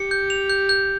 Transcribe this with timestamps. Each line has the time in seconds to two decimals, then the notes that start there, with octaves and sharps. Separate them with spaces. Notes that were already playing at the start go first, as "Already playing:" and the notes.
Already playing: G4 C#7
0.11 G6
0.30 F7
0.49 G6
0.69 G6